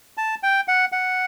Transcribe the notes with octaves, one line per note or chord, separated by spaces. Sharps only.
A5
G5
F#5
F#5